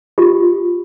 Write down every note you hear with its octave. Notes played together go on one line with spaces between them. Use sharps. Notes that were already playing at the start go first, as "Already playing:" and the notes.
F4 G4